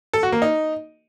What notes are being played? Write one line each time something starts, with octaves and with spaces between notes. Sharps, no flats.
A4
F#4
A#3
D#4